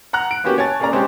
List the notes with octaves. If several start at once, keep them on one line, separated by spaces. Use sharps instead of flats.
F#5 A#5 F#6
D7
A#3 B3 C#4 F#4 G4
C#5 G#5 A5 A6
A#3 C#4 G#4 A#4 D5 A#5
G#3 C4 C#4 G4